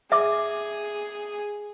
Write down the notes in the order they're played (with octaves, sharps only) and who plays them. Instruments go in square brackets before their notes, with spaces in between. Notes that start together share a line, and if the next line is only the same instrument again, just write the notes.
[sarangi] G#4 [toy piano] E5 D6